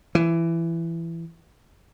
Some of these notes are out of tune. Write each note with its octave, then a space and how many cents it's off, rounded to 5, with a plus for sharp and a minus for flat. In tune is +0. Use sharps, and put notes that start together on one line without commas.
E3 +15